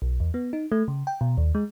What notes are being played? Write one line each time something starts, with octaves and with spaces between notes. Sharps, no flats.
B1
E2
B3
D#4
A3
C#3
G5
B2
D#2
G#3